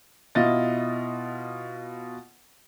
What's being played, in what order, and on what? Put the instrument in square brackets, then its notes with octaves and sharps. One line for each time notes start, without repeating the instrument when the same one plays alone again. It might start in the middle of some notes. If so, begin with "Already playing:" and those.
[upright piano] B2 E4 F4 D#5 A6